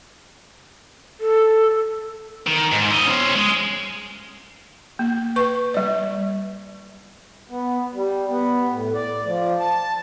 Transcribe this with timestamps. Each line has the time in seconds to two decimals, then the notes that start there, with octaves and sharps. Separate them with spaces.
1.20 A4
2.47 D#3
2.72 G#2
2.91 E4 D#5
3.06 C#4 C5
3.35 G#3
4.99 A#3
5.36 B4 C#6
5.74 G3 D5
7.49 B3
7.94 G3
8.29 B3
8.70 A2
8.94 D5
9.26 F3
9.59 A5